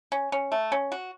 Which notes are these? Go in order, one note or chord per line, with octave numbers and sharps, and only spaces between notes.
C#4
C#4
A3
C#4
F#4